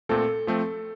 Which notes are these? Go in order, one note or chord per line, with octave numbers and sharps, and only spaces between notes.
A#2 A3 C4 A4
F3 A3 C4